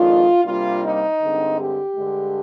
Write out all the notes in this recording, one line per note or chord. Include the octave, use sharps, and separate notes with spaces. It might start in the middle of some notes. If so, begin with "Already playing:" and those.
Already playing: F2 D#3 G#3 D4 F4
C3 G3 A#3 D4 F4
D#4
G2 D3 G#3 C4
G4
G2 D3 G#3